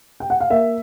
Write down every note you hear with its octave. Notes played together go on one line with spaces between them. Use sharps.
G5
F#5
F5
A#3 E5